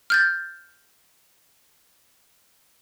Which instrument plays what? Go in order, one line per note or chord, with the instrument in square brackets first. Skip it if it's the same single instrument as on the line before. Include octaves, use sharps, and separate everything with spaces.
[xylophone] F6 G6 A6